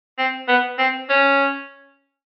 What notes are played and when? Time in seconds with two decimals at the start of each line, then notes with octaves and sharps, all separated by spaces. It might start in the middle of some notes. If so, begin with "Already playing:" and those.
0.18 C4
0.48 B3
0.78 C4
1.10 C#4